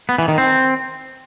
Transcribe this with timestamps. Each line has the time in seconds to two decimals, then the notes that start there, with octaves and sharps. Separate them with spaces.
0.09 B3
0.18 E3
0.28 D#3
0.38 C4